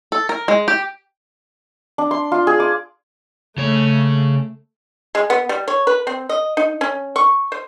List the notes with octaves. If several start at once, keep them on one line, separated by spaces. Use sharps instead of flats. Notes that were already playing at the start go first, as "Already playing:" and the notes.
A4
A#4
G#3
G4
D4
C6
F4
G#4
D6
C#3 A3 C#5
G#3
B3
G3
C#5
B4
C4
D#5
D#4
C#4
C#6
C5